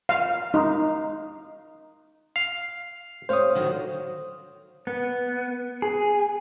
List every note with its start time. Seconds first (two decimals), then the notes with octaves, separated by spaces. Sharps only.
0.09 F5
0.54 D#4
2.36 F5
3.29 G4 C5 C#5 F5 D#6
3.55 D3 D#3 F#3
4.87 B3
5.82 G#4